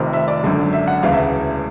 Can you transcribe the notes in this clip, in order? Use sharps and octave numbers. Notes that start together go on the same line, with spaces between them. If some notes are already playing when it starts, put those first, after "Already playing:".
Already playing: F1 F2 C3 D#3
E5
D5
G#1 F#2 D3
E5
F#5
E1 D2 C#3 E3 F5
E5